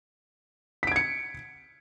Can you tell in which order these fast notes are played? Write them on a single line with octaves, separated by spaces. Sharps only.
B6 D7 G#6 C#7